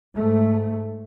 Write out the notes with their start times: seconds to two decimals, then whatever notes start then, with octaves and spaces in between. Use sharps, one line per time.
0.16 G#2 A3